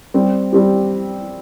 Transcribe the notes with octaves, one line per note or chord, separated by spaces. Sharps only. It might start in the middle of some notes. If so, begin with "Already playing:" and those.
G3 C4 G4
G3 C4 G4